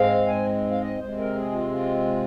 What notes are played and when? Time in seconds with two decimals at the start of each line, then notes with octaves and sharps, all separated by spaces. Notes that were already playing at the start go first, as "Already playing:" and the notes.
Already playing: G#2 G#3 C4 F5
0.27 G#5
0.71 F5
0.81 D#5
0.99 C3 G#3 C4 C5
1.18 A#4
1.35 G#4
1.52 F4
1.71 F4